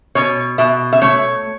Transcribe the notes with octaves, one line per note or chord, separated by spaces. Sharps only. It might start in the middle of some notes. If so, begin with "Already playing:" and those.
B2 C#5
B2 E5
E5
A3 C#5